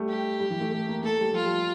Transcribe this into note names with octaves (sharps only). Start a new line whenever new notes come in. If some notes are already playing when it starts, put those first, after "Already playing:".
Already playing: G3 A3
G4
G3
E3
A3
A3
A#3
A3 A4
G3
F3 F4
G3